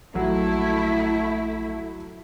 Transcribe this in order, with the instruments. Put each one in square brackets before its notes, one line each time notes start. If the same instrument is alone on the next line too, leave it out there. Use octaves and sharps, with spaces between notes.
[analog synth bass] A#1 [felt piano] F#3 [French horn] A3 [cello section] E4